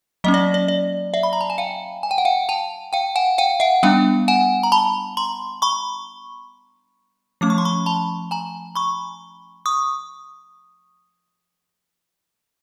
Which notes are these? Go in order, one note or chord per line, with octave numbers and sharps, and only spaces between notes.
F#3 A#3 C#4 D#5
D5
D5
D5
D5 E5
B5
A#5
A5
G#5
F5 G5
G#5
G5
F#5
F5 G5
G5 A5
F5 G5
F#5 G#5
F5 G5
E5 F#5
G3 B3 D4 F5 G5
F#5 G#5
A#5
A5 B5
A#5 C6
B5 C#6
F3 A3 C#4 D6
C#6
C6
B5 C#6
A5 B5
G#5 A#5
B5 C#6
C#6 D#6